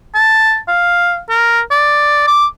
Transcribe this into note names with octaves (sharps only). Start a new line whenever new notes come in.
A5
F5
A#4
D5
D6